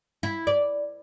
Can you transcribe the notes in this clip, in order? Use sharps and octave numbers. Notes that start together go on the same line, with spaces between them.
E4
D5